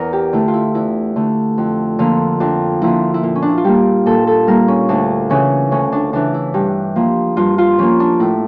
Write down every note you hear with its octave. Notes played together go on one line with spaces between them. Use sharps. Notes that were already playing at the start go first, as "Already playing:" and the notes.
Already playing: E2 A#4
G4
D3 A3 E4
F4
E4
E2 E4
D3 A3
F2
D3 F3 A#3
F2 D4
D3 F3 A#3 E4
E4
A#2 F4
C#4
D4
E4
F4
G3 A#3 G4
A#2 A4
A4
G3 A#3 A#4
C#4
D2 D4
C#3 E3 C#4
D2 C#4
D4
C#3 E3 D4
E4
G2 G4
F3 A#3
G2 F4
F4
F3 A#3 C#4
D4
A2 E4